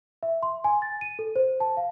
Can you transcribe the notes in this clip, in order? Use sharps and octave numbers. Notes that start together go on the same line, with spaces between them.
E5
C6
G#5
A6
D#7
A4
C5
A5
F5